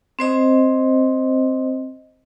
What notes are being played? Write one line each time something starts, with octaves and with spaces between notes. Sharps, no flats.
C4 C5 D#5